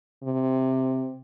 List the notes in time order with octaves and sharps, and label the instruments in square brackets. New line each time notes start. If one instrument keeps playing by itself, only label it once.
[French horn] C3